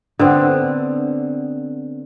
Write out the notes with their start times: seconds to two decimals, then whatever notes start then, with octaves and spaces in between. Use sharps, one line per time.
0.19 D3 B3 C4